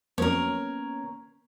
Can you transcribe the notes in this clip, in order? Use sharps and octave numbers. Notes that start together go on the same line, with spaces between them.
F2 F#3 A#3 B3 C#4 A#4 C#5